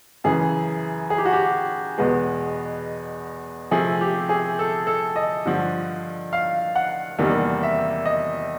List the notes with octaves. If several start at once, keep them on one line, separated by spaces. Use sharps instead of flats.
F#2 C#3 E3 G#4
G#4
G4
F#4
G4
E2 B2 G#3 B3
C3 F3 A3 G#4
G4
G#4
A4
A4
D#5
G2 D3 F3
F5
F#5
E2 C3 D#3 G3 A#3
E5
D#5